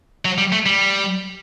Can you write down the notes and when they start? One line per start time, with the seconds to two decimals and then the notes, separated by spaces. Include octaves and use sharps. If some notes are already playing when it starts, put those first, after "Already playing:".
0.25 F#3
0.38 G3
0.52 A3
0.66 G3